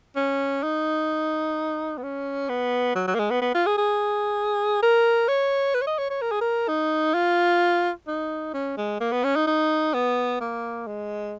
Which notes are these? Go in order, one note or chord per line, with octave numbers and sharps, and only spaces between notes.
C#4
D#4
B3
C#4
B3
F#3
F#3
A#3
G#3
B3
B3
F4
G#4
G#4
A#4
C#5
B4
C#5
D#5
C#5
C#5
A#4
G#4
A#4
D#4
F4
D#4
C#4
G#3
A#3
B3
C#4
D#4
D#4
B3
A#3
G#3